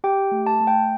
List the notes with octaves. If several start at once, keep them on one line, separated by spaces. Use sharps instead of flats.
G4 G5
A3
A5
A3
G5